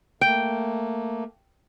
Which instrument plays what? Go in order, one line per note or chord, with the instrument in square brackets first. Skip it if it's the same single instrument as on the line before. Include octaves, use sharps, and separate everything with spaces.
[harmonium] A3 A#3 [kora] G5